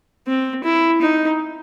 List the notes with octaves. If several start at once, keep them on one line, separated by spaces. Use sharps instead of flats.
C4
E4
D#4